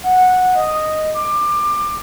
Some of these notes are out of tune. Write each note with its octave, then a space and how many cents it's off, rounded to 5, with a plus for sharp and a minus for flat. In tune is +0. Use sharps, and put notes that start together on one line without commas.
F#5 -10
D#5 -5
D6 +20